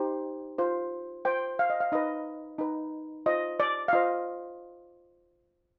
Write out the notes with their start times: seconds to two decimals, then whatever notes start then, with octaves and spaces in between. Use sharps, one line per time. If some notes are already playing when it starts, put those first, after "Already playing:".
Already playing: D#4 G4 C5
0.58 F4 C5
1.25 F4 C5 G5
1.59 F5
1.70 D#5
1.80 F5
1.92 D#4 B4 D#5
2.59 D#4 B4
3.26 F4 C5 D#5
3.60 D5
3.88 F5
3.93 F4 C5 D#5